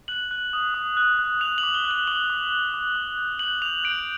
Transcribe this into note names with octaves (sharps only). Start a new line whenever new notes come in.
F#6 F#7
F#6
D#6
D#6
F#6
F#6
F#6 F7
F#7
D6
G7
F#6
F#7
D6 F#7
D6
F#6
D6
D6
G6
G6 F#7
D6 F7
G6 D7